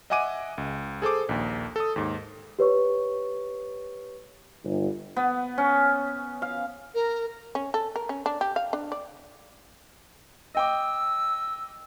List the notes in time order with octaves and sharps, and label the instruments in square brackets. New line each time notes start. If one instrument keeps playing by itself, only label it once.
[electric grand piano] D#5 E5 F#5 G#5 D6 D#7
C#2
G#4 A4 C5 D6
A#1 D#2
A4 D#6
D#2 G#2
[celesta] G4 B4 C#5 C#6
[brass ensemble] G1
[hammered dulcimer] B3
C#4
F5
[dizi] A#4
[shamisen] C#4
A4
A#4
C#4
D4
G4
F5
D4
D5
[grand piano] D#5 G5 D6 [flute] E6